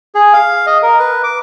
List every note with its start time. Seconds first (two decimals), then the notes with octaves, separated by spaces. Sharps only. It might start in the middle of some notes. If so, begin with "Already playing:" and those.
0.15 G#4
0.33 F5
0.66 D#5
0.83 A#4
0.99 B4
1.24 D6